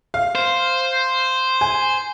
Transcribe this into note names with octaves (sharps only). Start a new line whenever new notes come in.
F5
C5
G#5